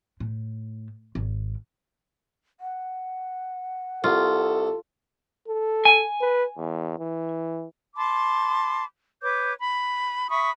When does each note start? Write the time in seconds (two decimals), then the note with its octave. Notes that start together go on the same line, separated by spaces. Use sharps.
0.20 A2
1.15 G#1
2.60 F#5
4.04 C2 F4 A4
5.48 A4
5.85 G#5
6.21 B4
6.57 E2
6.98 E3
7.96 A5 B5 C6 D6
9.22 B4 C#5 D6 G6
9.60 B5
10.30 E5 B5 C#6 D#6